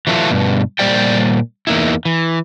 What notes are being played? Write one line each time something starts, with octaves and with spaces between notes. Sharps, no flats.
E3 F#3 A3 E4 F4
G2 B2
A#2 G3 C5 D5 G5
E2 A#3 D#4 E4
E3